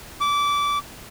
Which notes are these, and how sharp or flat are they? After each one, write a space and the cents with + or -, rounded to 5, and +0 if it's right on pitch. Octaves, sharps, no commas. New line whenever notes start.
D6 -20